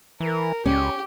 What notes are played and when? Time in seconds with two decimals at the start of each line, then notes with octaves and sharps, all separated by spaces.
0.20 E3 A#4
0.66 C#2 C#4 G4